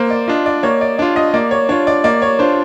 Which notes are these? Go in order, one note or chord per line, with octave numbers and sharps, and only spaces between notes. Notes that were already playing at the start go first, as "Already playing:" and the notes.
Already playing: A#3 C5
D5
D4 F4 D#5
D5
A#3 C#5
D5
D4 F4 D5
D#5
A#3 D5
C#5
D4 F4 C#5
D5
A#3 D5
C#5
D4 F4 C5